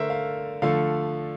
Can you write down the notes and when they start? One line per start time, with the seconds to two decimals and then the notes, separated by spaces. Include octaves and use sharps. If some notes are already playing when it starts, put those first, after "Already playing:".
Already playing: D3 A3 A#4 C5 E5
0.10 F5
0.62 D3 F3 A3 F5